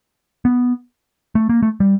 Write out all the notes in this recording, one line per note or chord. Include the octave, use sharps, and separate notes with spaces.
B3
A3
A#3
A3
G3